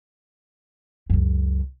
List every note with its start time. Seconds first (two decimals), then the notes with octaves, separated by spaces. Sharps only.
1.10 C#2 F#2